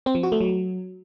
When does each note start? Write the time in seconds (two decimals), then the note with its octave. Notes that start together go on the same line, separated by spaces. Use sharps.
0.06 C4
0.15 F3
0.23 F#4
0.32 A3
0.41 F#3